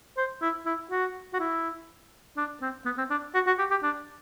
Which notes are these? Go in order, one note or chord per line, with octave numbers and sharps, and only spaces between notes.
C5
E4
E4
F#4
F#4
E4
D4
C4
B3
C4
D4
F#4
F#4
G4
G4
D4